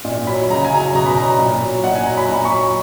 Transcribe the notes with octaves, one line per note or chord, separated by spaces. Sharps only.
A#2
F#3 B5
C#3 A#5
G#5
F#3 A#5
G#5
B2 A#5
B5
F#3 A#5
A#2
F#3
A#2 F#5
G#5
F#3 A#5
B5
A#2 A#5
C#6
F#3 B5